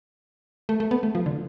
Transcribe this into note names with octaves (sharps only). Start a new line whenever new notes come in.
A3
A3
B3
A3
F3
D3